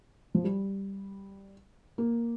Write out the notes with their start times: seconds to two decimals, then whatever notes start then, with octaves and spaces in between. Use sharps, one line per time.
0.35 F3
0.44 G3
1.98 A#3